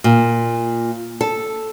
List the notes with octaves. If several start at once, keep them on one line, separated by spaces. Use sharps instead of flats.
A#2
A4